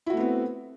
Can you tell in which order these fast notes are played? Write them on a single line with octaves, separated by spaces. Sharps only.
E4 F#4 A3 B3 C4